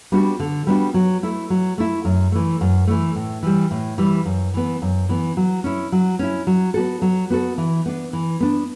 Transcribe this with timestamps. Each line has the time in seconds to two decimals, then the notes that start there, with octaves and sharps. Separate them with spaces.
0.12 G3 B3 D4 F#4
0.40 D3
0.67 G3 B3 D4 F#4
0.94 F#3
1.23 A3 E4
1.50 F#3
1.78 A3 E4
2.05 F#2
2.32 E3 A3
2.61 F#2
2.87 E3 A3
3.15 A2
3.43 E3 G3
3.71 A2
3.98 E3 G3
4.25 F#2
4.54 E3 B3
4.82 F#2
5.09 E3 B3
5.37 F#3
5.64 C#4 E4
5.92 F#3
6.19 C#4 E4
6.47 F#3
6.74 B3 F#4 A4
7.02 F#3
7.30 B3 F#4 A4
7.58 E3
7.86 B3 D4
8.13 E3
8.40 B3 D4